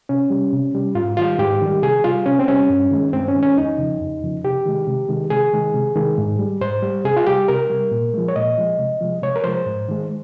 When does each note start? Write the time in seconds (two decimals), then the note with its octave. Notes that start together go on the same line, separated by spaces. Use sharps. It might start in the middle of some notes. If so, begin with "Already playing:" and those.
0.09 C3 C#4
0.30 G3
0.53 C3
0.74 G3
0.95 G#2 F4
1.17 D#3 G3 F4
1.39 G#2 G4
1.62 D#3 G3
1.82 C3 G#4
2.04 G3 F4
2.26 C3 C#4
2.39 C4
2.48 G3 C#4
2.69 G2
2.92 D#3 G#3
3.13 G2 C4
3.28 C#4
3.35 D#3 G#3
3.43 C#4
3.57 F2 D#4
3.78 C#3 F3
4.00 F2
4.23 C#3 F3
4.44 C3 G4
4.66 D#3 G#3
4.87 C3
5.09 D#3 G#3
5.30 C3 G#4
5.53 D#3 G#3
5.74 C3
5.96 D#3 G#3
6.18 G#2
6.39 G3
6.61 G#2 C5
6.83 G3
7.05 C3 G#4
7.17 F4
7.27 G3 G4
7.48 C3 A#4
7.70 G3
7.91 A#2
8.14 F3 G#3
8.28 C#5
8.36 A#2 D#5
8.58 F3 G#3
8.79 C3
9.01 F3 G#3
9.22 C3 C#5
9.36 A#4
9.44 F3 G#3 C5
9.66 G#2
9.89 D#3 G#3